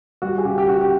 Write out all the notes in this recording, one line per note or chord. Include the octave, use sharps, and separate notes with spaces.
G3 F#4
G#4
C#3 G4
G4
C#3 F#4
G4